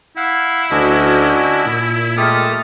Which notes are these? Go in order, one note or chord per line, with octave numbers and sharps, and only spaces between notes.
E4 F5 F#5
D2 C#4 D4 F#4 D#5
A#2
G#3 A3 G4 A4 A#4 D#6 F6